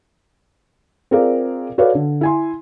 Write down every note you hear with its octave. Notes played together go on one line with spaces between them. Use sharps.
C4 F4 G#4 A#4 D5 F5
F#4 A4 B4 C#5 D5 F5
D3
E4 G#5 C6